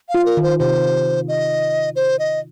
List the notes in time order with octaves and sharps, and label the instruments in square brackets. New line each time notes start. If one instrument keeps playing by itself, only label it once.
[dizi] F5
[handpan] F4
[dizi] A#4
[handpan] D#3
[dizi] C5
[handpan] C3 [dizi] C5
[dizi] D#5
C5
D#5